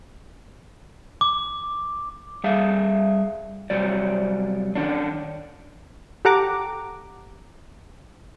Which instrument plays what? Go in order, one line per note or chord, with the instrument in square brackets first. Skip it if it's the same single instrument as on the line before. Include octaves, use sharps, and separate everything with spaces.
[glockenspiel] D6
[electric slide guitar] G3 G#4 E5 F5
C3 F#3 G3 D5
D#3 C#4 D4
[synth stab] G4 A4 F#5 A#5 D6